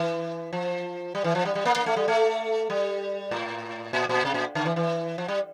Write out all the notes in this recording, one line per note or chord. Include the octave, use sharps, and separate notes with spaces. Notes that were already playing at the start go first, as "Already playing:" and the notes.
Already playing: E3
F3
G3
E3
F3
G3
G3
A#3
A#3
A3
G3
A3
G3
A2
A#2
A#2
C3
A#2
D3
E3
E3
F3
G3